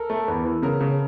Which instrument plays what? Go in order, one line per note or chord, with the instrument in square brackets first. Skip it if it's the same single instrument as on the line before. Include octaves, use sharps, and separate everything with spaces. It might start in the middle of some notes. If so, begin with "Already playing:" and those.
Already playing: [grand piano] A4 A#4
[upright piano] A3
[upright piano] E2 [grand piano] B4
[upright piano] E3
[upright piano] C#3 [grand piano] A#4
[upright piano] C#3